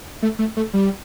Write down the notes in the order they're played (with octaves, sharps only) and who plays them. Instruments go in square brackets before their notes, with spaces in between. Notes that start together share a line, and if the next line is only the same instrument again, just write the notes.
[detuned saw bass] A3
A3
A3
G3